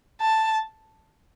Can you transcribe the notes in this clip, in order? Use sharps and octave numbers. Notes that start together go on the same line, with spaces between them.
A5